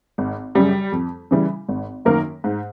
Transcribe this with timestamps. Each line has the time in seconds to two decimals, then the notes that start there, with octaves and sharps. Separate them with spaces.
0.18 G#1
0.55 F#2 C#3 G3 G4
0.92 F2
1.31 C#3 E3 G3
1.68 G#1
2.05 F#2 D#3 A#3 A#4
2.44 G#2